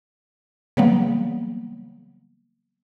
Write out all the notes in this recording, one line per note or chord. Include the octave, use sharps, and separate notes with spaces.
C#3 E3 F#3 G3 A#3 B3